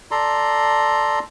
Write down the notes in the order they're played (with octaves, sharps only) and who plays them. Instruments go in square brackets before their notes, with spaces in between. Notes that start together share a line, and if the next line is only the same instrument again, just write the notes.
[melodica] A4 D5 A#5 C6